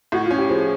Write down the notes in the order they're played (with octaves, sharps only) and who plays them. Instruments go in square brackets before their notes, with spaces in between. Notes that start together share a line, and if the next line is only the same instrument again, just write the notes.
[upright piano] A2 [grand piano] F#4
[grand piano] F4
[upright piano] C#4
[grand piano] G4
[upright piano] F3 [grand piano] G#4